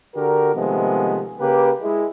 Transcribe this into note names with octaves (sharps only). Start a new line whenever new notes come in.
D3 F#4 G4 A#4
C3 D#3 F3 G#3 A3 B3
C#3 A#3 G4 B4
G#3 E4